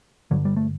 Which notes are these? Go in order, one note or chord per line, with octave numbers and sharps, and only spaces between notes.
G1 G2 D3 F#3
G3
A3